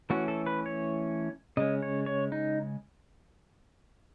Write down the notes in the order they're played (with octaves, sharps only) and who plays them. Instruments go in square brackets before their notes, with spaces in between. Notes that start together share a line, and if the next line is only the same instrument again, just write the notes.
[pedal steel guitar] E3 A3 C#4 F#4
A4
B4
C#5
C#3 G#3 C#4 D#5
C#5
C#5
D#4